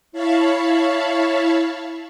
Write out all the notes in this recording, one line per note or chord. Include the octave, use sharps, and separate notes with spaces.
E4 C#5 F5 A5 B5 C#6